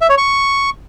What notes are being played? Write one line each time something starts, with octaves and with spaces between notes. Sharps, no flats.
E5
C#5
C#6